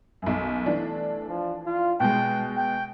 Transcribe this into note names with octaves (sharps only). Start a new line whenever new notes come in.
B1 F#2
E3 A3 D4
F3
F4
B2 G#3 G5
G5